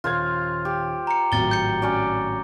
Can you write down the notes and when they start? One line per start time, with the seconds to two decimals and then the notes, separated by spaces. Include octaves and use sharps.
0.04 D#1 F4 C5 F5 G#6
0.65 G4
1.07 A#5 C#7
1.32 G#1 A2 F#3 A6 G7
1.51 G6 C#7
1.82 C#4 F#4 D5